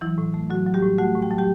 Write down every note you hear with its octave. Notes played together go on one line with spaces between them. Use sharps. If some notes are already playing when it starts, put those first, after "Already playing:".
E3 F#3 E4
A2
A3
A2 F#3 F#4
F#3
G3 G4
A2
A3 F#4 F#5
A2
G5
F#3 A5
G4 G5